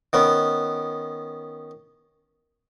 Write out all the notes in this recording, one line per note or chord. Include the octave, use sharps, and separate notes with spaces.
D#3 B3 C#4